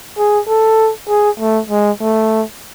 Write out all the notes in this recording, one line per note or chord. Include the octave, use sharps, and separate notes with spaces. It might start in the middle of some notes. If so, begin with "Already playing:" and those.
G#4
A4
G#4
A3
G#3
A3